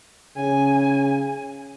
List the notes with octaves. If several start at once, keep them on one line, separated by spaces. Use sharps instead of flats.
C#3 G#5